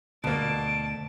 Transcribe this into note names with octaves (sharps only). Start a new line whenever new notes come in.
D2 B2 A#3 A5 D7